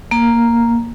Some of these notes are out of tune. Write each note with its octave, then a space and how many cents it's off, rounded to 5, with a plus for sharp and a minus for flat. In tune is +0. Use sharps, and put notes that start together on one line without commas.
A#3 +0 A#5 +0